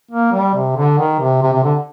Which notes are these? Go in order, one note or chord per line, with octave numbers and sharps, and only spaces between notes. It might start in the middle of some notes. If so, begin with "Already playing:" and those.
A#3
G3
C3
D3
D#3
C3
C3
C3
D3